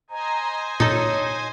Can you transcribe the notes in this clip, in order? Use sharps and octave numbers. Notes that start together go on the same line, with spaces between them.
C5 D#5 G#5 A#5
A#2 D#4 A4 C#5